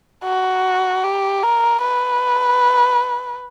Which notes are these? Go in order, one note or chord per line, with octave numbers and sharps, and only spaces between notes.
F#4
G4
A#4
B4